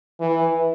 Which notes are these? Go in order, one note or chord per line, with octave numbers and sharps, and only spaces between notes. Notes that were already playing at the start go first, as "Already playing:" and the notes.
E3